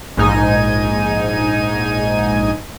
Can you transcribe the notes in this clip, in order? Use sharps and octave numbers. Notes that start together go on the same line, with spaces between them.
A#1 G#2 D#4 G#5 D#7